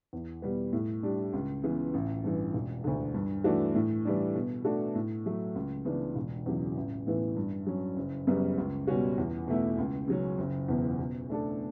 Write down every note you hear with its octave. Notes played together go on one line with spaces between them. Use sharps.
E2
B2 G3 B3
A2
G3 D4 G4
C#2
C#3 E3 B3
A1
G2 E3
E1
D2 D3
G2
E3 A3 D4 F#4
A2
E3 G3 D4
B2
A3 D4 F#4 A4
A2
F#3 A3
C#2
C#3 E3 B3 D4
E1
E2 C#3 F#3
A1
A2 E3 B3
G2
F#3 C#4
F#1
F#2 C#3 G3 B3
C#2
B2 G3 C#4 F#4
E2
B2 A3 E4
C#2
C#3 F#3 C#4
F#1
E2 B2
B2
A3 D4 A4